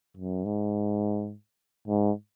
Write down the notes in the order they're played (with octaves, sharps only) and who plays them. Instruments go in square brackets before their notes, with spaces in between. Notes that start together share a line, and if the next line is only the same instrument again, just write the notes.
[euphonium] F#2
G#2
G#2